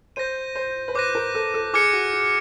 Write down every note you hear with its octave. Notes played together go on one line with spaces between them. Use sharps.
C5 G6 A#6 D#7
C5
B4
C5 D6 F#6 A#6 D#7
A#4
A4
A4
G#4 D6 F6 G#6 C#7
F#4
G#4